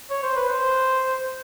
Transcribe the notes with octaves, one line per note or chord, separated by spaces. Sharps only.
C#5
C5
B4
C5